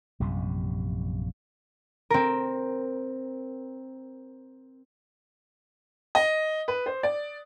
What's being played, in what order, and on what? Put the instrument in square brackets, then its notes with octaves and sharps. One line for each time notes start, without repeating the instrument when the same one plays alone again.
[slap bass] A#1 F#2 C3 G3
[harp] C4 A#4
[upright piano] D#5
B4
C5
D5